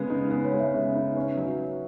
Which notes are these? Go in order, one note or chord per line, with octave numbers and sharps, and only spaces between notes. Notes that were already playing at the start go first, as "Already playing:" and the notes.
Already playing: C#3 G#3 B3 A#4
D#4
B3 B4
C#5
G#3
C#5 E5
C#3
D#4
C#4
F#3